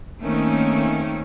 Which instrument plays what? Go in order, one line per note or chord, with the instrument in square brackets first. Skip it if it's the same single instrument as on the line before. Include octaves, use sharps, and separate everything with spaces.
[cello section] D#3 A3 A#3 C4 C#4 D#4